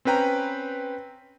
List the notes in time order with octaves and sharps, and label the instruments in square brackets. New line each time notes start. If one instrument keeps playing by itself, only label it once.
[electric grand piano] C4 C#4 B4 G5 A#5